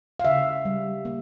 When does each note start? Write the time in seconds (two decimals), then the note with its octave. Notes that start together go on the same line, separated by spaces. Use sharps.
0.20 F5
0.25 C#3 E5
0.65 G3
1.05 A#3